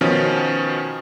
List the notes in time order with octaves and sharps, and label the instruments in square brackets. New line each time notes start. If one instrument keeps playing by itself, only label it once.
[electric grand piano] B2 D#3 F3 C#4